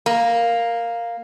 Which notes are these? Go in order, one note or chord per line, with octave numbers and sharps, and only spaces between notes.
A#3